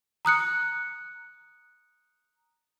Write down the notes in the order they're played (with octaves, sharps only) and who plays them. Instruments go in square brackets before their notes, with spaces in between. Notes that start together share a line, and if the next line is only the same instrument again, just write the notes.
[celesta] A#5 D#6 F#6 C#7